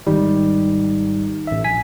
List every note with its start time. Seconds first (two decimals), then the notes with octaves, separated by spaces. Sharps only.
0.07 G#1 G#2 D#3 G3
1.47 A1 E5
1.64 A#1 G#5 B6